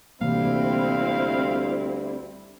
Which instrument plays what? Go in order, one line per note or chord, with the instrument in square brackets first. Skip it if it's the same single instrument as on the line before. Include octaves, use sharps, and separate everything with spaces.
[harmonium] D2 G3 [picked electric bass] C3 E3 A#3 [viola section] C4 E4 [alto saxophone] F5